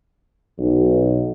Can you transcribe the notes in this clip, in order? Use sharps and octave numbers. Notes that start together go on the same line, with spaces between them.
B1